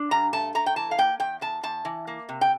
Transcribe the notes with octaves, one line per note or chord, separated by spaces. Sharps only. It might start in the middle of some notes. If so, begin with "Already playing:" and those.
Already playing: D4
G2 A#5
A3 A5
A3 A#5
G5
E3 A5
F5
A#3 G5
E2 G5
E2 A5
E2 A5
E3
A#3
C3
G5